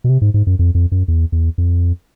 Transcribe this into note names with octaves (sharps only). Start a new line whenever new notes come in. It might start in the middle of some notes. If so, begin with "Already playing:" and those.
B2
C3
G#2
G#2
F#2
F2
F2
F#2
E2
E2
F2